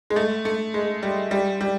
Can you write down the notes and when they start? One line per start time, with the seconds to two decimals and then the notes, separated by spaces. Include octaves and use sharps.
0.10 G#3
0.16 A3
0.45 A3
0.74 G#3
1.03 G3
1.31 G3
1.61 G3